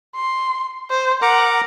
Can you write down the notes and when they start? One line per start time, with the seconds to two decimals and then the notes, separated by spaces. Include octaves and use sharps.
0.16 C6
0.90 C5
1.22 A#4 F#5 A#5 D6